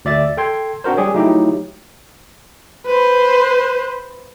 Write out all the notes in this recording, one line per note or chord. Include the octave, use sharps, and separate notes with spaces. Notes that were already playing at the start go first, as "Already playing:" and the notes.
D2 D5 E5 A6
A4 G5 C6 G#6
C4 D4 F#4 A#4 C5
G3 G4 G#4 C#5
F#3 A3 D#4 E4 G4
B4 C5